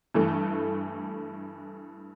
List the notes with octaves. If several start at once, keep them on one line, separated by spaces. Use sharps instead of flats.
G2 E3 A3